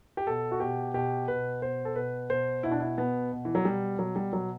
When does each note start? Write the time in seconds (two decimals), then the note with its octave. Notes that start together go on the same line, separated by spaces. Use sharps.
0.17 G4
0.27 B2 A4
0.51 F#4
0.60 B2 G4
0.94 B2 G4
1.28 B2 B4
1.62 B2 C5
1.85 A4
1.96 B2 B4
2.30 B2 C5
2.63 B2 E4
2.71 D4
2.80 E4
2.97 B2 B3
3.32 B2
3.45 E3
3.55 F#3
3.65 B2 G3
3.99 B2 F#3
4.16 G3
4.33 B2 F#3